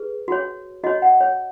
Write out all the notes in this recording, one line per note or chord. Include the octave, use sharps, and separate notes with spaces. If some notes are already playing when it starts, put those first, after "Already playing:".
Already playing: G#4 B4
F#4 C#5
F#4 C#5 D#5
F#5
C#5